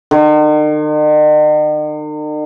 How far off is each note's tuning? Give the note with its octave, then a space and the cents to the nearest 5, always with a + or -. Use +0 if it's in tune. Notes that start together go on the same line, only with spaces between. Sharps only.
D#3 -45